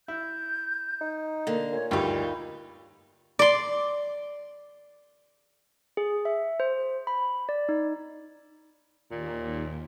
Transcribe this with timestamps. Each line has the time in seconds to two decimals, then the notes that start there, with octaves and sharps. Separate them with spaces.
0.08 E4 G6
1.01 D#4
1.47 D3 A#3
1.72 A#2 C#5
1.91 D2 G2 D#4 F4 G4 B5
3.39 D5 C6
5.97 G#4
6.25 E5
6.60 C5
7.07 B5
7.49 D5
7.69 D#4
9.11 D#2 A#2